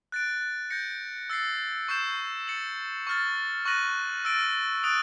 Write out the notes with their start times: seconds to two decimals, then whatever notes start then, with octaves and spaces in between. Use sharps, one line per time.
0.12 F#6 A6 D7
0.70 G6 A#6 C#7
1.30 E6 A6 C7
1.88 C#6 E6 G6 C7 E7
2.48 A6 C#7 F#7
3.07 C#6 F6 A6
3.66 C#6 F#6 A#6 D#7 F#7
4.25 E6 A6 D7
4.84 D#6 F#6 A6 D7